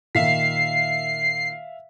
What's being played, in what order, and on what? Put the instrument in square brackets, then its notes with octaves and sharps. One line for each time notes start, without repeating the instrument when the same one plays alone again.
[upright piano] A#2 D#3 [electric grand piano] E5 F5 B6 [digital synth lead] C7